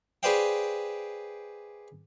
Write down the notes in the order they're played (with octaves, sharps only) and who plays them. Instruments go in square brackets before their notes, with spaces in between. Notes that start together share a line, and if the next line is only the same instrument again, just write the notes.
[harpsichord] G#4 B4 C5 D5 F5 G5